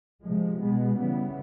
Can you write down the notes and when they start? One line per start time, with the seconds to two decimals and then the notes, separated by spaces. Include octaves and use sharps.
0.23 C3 F3 G#3
0.59 B2 G#3 B3
0.97 C#3 E3 G3 B3